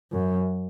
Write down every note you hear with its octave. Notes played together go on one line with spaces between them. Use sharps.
F#2